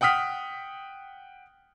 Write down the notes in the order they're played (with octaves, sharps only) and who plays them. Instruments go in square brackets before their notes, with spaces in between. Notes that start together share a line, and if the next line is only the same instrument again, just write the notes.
[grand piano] F#5 G5 D#6 F6 B6